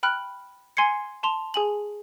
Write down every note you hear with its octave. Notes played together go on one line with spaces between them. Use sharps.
G5 B5 F6 F#6
G#5 C6 G#6 C7 C#7
A5 C6 F7
G#4 G#5 F#7